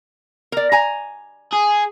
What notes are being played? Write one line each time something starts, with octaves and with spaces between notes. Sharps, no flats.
A#4 D5
G#5 A#5
G#4